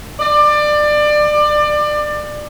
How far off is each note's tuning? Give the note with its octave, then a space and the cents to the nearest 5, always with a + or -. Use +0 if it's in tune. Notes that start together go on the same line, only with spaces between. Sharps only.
D5 +25